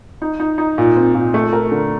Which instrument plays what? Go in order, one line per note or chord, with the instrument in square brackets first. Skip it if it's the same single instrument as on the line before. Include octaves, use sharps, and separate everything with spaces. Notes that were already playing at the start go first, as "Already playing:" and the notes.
[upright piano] D#4
D#4
D#4
A#2
C4
A#2
A3
A#4
D3